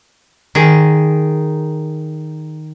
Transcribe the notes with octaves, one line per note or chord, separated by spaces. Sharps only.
D#3 G#4